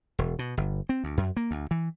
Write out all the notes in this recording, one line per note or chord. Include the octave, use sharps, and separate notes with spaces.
E1
B2
G1
C4
D2
F#2
A#3
D2
E3